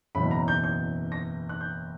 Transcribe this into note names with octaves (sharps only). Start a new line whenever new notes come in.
F#1 E2 B2 F#3 B5
A#5
G6
G6
A#6
F#6
G6